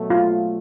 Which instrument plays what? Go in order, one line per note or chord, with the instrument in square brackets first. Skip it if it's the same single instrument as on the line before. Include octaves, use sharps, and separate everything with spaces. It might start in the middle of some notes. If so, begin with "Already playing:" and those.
Already playing: [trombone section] B2 F#3 A3
[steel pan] F4